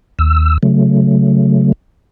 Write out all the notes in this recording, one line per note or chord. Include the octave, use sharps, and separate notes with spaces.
D#2 E6
C#3 F#3 A3